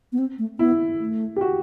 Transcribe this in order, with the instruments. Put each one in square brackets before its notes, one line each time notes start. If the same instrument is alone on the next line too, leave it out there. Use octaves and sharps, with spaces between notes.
[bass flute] B3
C4
A3
[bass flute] B3 [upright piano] E4
[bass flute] A3
[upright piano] G4
F#4